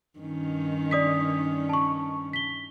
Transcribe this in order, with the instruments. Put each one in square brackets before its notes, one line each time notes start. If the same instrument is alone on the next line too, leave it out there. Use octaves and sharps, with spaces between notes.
[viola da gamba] G2 D#3 C#4
[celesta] D5 D#6 B6
A5 C#6
B6 G7